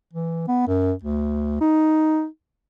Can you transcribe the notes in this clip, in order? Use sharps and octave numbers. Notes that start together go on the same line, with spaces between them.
E3
B3
F#2
D2
D#4